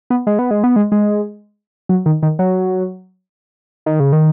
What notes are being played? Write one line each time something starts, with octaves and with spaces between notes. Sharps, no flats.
B3
G#3
B3
G#3
B3
G#3
G#3
F#3
D#3
D#3
F#3
D#3
C#3
D#3